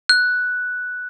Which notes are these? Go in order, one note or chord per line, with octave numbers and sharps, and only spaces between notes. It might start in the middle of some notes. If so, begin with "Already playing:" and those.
F#6